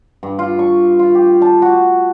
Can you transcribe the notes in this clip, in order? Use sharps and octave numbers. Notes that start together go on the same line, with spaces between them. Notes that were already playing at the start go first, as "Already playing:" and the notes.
G2
F4
C#6
F4
G4
A5
F#4